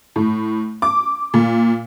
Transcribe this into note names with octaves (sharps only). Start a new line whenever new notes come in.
A2
D6
A#2